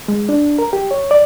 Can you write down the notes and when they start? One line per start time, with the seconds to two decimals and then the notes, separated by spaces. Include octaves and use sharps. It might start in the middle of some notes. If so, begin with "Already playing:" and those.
0.08 G#3
0.29 D4
0.59 A#4
0.73 G4
0.91 C#5
1.11 D5